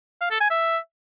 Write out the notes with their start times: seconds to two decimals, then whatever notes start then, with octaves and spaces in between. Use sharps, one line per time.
0.21 F5
0.31 A4
0.41 G#5
0.50 E5